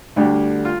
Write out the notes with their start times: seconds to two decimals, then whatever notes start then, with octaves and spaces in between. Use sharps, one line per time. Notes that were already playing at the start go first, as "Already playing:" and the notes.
0.16 D2 D3 G3 D4 G4
0.65 F4